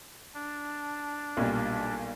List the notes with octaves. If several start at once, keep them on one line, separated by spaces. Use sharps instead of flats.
D4
B1 A#2 G3